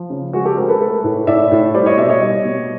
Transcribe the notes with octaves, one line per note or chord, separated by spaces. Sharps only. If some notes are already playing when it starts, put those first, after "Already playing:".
Already playing: F3
C#3
G#3 F#4 G#4
G4 A4
G#3 A#4 C5
A4 B4
A3 A4 B4
A2
A2 D5 E5
A2
G3 C5 D5
C#5 D#5
B2 D5 E5
C#5 D#5
G3
B2